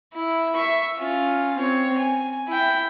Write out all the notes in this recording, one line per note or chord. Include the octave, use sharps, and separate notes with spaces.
E4
E5 C#6
C#4 F4
C4 C#5
G#5
E4 G5